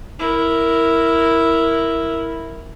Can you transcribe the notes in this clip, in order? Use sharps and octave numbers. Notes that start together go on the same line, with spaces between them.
E4 A#4